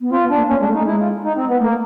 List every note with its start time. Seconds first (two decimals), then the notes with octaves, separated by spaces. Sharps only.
0.01 B3
0.11 C4 F4
0.24 B3
0.30 D4
0.37 A#3
0.48 A#3 C#4
0.61 G#3 D4
0.67 A3
0.74 D#4
0.80 A3
0.86 G#3 E4
0.99 F4
1.24 D#4
1.36 C4
1.48 B3
1.60 A3 A#3